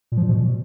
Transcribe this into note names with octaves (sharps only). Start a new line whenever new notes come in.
A#2
F3
A#2
B2